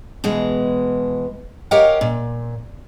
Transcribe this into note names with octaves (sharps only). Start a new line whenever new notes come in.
B2 E3 G#3
G4 A#4 C#5 D#5 F5 F#5
A#2